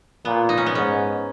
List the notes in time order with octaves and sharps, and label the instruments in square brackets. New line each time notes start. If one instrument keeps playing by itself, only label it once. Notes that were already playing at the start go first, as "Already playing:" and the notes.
[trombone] A#2 [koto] B3
[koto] D#4
C#4
B3
[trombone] G#2 [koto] C#4